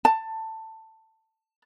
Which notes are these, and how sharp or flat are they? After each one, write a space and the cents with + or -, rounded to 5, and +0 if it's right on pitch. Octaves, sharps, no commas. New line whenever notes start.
A5 +15